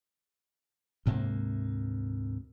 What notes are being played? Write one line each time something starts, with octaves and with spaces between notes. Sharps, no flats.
D2 G#2 C3 A#3